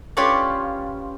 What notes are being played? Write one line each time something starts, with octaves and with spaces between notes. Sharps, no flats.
C#4 F4 G4 B4 C#5 D5